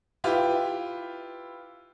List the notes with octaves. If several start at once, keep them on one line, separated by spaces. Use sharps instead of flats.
E4 F4 G4 B4